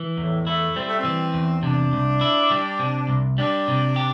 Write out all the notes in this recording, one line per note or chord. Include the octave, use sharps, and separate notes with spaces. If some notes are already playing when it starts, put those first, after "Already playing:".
Already playing: E3
E2 A2
A3 E4
G3 C4
A3
C4
E3
E2
C3 D4
C2
E4
G3
C3
C2
G3 D4
C3
G4